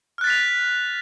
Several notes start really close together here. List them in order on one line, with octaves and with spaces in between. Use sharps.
F6 F#6 A6 B6 F7